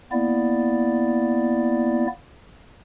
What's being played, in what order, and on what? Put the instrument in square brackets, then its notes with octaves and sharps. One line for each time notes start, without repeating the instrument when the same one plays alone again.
[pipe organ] A#3 B3 E4 D5